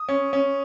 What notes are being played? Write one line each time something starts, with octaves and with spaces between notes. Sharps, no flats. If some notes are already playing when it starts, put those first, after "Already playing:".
Already playing: D#6
C#4
C#4